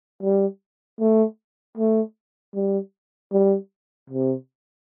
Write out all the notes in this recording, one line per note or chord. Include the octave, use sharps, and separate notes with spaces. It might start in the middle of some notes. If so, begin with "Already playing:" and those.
G3
A3
A3
G3
G3
C3